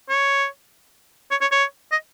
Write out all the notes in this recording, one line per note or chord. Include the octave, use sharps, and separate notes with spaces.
C#5
C#5
C#5
C#5
D#5